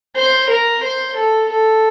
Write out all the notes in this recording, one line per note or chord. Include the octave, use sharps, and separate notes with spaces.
C5
A#4
C5
A4
A4